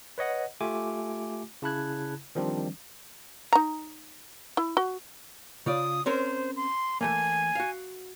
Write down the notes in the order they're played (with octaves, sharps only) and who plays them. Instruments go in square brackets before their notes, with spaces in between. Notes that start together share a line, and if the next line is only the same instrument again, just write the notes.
[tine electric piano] B4 C#5 D#5 F#5
A3 F4 G4 G#5 D6
C#3 E4 A5 B5 F#6 G#6
D#3 F3 G3 C4 D4
[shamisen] D#4 A#5
E4
F#4
[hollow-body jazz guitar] C#3 F4 D5 [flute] D#6
[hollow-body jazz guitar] C4 C#4 A#4 [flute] C5
[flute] C6
[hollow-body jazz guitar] E3 A3 A#3 [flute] G#5
[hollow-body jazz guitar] F#4 F5